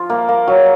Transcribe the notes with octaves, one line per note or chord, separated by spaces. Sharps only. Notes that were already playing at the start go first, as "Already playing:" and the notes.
Already playing: F3 F4
A#3
A#3
F#3